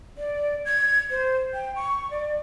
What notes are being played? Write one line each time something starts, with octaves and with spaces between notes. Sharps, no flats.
D5
G#6
C5
G5
C#6
D5